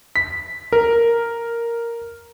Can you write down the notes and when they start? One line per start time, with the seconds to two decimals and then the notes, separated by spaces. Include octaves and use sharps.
0.16 B6
0.72 A#4